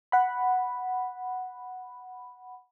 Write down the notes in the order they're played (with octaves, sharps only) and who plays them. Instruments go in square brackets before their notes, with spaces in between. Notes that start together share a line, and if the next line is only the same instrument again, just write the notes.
[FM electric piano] F#5 B5